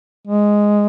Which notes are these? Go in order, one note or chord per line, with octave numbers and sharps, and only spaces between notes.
G#3